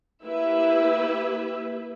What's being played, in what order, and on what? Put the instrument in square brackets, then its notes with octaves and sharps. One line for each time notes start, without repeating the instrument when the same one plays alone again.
[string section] A#3 E4 G4 B4 E5